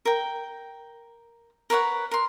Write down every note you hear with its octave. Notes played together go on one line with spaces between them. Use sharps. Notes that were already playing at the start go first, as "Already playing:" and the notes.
A#4 G5
A#4 B4 C#5 F#5
A#4 C6